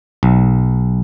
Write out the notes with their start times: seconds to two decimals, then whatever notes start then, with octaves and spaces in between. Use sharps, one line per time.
0.23 B1